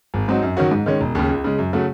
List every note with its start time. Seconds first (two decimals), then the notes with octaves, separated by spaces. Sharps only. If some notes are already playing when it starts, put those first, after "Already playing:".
0.14 G#1
0.28 G#2 F#3 C4 D#4
0.43 F#2
0.57 D#3 F#3 C#4 F#4
0.71 G#2
0.86 D#3 G#3 C#4
1.01 E1
1.15 D#2 C#3
1.29 C#2
1.44 C#3 G#3
1.59 F#2
1.73 C#3 F#3 A3